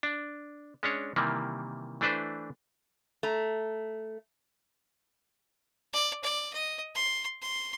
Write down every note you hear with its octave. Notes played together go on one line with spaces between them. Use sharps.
D4
G#3 C#4 D4 C#5
C3 D#3 E3 G3 A#3
E3 A3 D4 B4 C5
A3 A#5
D5
D5
D#5
C6
C6